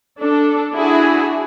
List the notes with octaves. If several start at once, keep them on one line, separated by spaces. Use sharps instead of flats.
D4 A4
D4 E4 F#4 G#4 E5 G#5